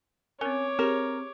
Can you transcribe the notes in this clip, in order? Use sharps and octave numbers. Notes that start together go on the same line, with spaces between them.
C4 C#4 A#4 C#5 D6
C4 G4 G#4 A#4